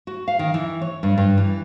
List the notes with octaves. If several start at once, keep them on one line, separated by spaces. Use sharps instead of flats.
F#4
F5
D#3
E3
C#5
G2
G2
E3